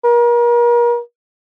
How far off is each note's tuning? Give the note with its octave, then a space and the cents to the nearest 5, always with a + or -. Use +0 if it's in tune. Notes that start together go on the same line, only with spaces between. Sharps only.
A#4 +35